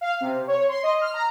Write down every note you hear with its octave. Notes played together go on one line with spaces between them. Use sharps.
F5
C3
C#5
C6
D#5
F6
A#5